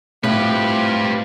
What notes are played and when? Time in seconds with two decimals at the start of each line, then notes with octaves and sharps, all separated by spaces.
0.24 A2 G3 C4 F4 G4 B4